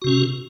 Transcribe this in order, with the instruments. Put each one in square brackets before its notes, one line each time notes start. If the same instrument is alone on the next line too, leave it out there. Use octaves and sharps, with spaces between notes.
[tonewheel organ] F#4
C3
C#4